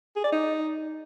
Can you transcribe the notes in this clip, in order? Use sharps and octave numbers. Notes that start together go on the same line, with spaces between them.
G#4
D5
D#4